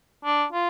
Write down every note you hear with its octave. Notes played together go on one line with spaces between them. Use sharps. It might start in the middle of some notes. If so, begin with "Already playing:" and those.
D4
F4